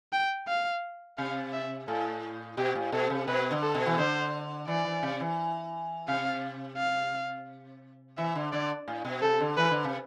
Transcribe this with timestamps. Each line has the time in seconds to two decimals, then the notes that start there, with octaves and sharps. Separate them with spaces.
0.13 G5
0.47 F5
1.18 C3 F5
1.53 E5
1.87 A2 A4
2.57 B2 G4
2.75 A2
2.92 B2 A4
3.10 C3
3.28 B2 B4
3.51 D3
3.63 A4
3.74 B2
3.86 E3
3.98 D3 C5
4.67 E3 D5
4.85 E3
5.03 C3
5.20 E3
6.08 C3 F5
6.77 F5
8.17 E3 E5
8.35 D3
8.52 D3 D5
8.88 A2
9.05 B2
9.22 C3 A4
9.40 D3
9.57 E3 B4
9.71 D3
9.84 C3